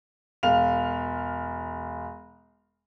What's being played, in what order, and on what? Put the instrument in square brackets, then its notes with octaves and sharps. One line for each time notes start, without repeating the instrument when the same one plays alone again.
[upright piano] E1 F5 F7